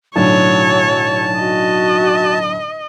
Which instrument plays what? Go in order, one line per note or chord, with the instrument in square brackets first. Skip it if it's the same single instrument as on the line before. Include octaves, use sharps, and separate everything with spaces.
[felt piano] B1 A2 D3 [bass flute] F#3 [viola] C#5 [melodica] A5
[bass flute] F#4 [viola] D#5